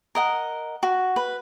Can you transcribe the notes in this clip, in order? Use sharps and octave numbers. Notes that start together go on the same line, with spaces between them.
A#4 D#5 F#5
F#4
B4